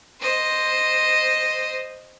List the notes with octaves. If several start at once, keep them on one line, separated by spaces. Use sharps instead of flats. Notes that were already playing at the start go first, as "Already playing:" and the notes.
C5 D#5